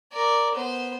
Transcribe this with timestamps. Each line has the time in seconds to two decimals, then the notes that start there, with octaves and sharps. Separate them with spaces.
0.12 A#4 D5
0.55 B3 C5